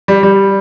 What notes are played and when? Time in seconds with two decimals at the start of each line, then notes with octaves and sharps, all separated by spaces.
0.08 G3
0.23 G3